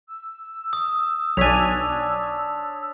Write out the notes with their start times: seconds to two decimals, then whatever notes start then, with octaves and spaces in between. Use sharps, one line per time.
0.09 E6
0.73 D#6
1.37 B1 D4 C#5 G#5 B6 F7